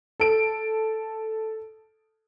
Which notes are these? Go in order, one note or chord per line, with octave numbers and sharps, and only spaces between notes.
A4 D7